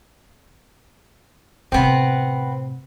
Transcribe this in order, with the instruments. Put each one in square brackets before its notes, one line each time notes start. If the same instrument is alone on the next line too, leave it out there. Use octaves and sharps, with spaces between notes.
[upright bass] A2 C3 [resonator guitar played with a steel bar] B3 C4